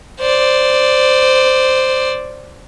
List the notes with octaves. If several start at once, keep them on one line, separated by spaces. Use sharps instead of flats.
C5 D5